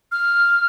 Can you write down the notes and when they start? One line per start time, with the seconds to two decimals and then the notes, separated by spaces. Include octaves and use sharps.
0.12 F6